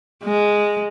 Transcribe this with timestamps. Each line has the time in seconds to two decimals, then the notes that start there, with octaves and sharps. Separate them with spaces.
0.24 G#3